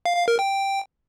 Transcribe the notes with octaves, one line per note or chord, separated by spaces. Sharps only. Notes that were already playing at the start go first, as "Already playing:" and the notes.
F5
F5
A#4
G5